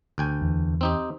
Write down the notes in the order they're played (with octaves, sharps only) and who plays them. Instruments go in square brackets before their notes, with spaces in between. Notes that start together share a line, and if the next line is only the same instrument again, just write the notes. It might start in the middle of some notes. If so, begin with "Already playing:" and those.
[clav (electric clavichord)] D2 G5 G#5
[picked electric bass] E2
[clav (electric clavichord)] C4 D#4 G4